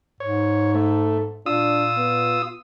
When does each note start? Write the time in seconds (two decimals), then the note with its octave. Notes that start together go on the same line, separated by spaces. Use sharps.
0.20 G#2 C#5
0.75 A3 A4
1.46 A#2 D4 F4 D#6 E6
1.97 B3